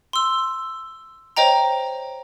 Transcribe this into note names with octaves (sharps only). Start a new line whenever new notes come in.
C6 E6
C5 C#5 D#5 G5 A#5